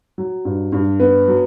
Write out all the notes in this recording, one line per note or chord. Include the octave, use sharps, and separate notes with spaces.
F#3
G2
G2
B3
F#3